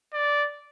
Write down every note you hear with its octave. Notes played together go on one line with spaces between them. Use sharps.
D5